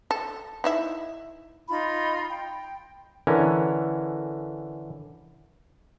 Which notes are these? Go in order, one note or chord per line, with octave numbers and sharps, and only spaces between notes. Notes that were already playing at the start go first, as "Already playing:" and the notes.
A4
D#4 E4 E5
D#4 F4 B5
G5
D3 E3 C#4 A#4